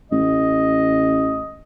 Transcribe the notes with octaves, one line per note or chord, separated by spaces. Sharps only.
A1 D#5